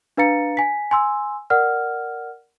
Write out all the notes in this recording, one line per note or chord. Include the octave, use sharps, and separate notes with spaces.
D4 B4 F5 A#5 A6 C#7
G#5 B6
G#5 C6 E6
A#4 D5 F#5 F6